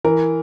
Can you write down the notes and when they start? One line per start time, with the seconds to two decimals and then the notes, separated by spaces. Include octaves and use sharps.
0.04 E3 A#4